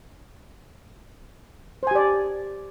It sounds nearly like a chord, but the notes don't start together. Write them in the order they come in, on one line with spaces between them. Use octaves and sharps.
C5 G#5 G4 D5